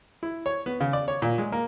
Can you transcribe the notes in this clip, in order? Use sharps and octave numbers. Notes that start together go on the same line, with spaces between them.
E4
C#5
B3
C#3
D5
C#5
A#2
G#3
A#3